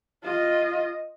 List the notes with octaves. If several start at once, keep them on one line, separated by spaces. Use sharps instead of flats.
F4 D#5